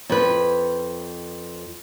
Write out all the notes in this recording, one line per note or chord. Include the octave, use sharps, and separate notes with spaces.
F2 B4